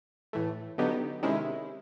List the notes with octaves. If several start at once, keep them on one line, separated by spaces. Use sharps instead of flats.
A2 E3 A3
D3 F#3 B3 D#4 G4
C3 D#3 G#3 C#4 E4